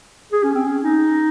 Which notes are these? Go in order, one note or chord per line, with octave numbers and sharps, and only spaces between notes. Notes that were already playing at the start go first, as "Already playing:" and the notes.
G#4
C#4
C4
C#4
D#4